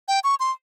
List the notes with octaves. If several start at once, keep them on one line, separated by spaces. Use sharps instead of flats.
G5
C#6
C6